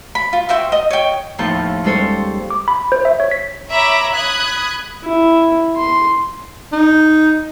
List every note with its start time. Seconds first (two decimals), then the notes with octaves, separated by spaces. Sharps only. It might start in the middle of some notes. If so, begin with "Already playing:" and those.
0.15 B5
0.33 F4
0.49 F#4 C5 E5 G5
0.72 D#5 D#6
0.91 C#5 G5
1.38 D#2 A2 F3 F4 A5 G6
1.84 G3 G#3 C#4 A4 C5 C#5
2.50 D6
2.68 B5
2.92 C5
3.05 E5
3.20 C#5
3.31 B6
3.68 C#5 E5 A#5 B5 D6
4.13 B5 D#6 F#6 G#6
5.03 E4
5.77 C6
6.72 D#4